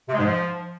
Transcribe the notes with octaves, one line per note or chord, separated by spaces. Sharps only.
C3
G#3
G#2
F3